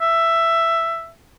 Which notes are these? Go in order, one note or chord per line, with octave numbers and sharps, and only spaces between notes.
E5